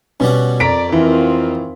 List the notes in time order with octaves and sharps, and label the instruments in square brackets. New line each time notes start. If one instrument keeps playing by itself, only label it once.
[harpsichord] B2 G3 F#5 [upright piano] C#4
[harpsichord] F2 [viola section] A#4 D5 [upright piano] A#5 B6 D7
[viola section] D#3 C4 F4 [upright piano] E3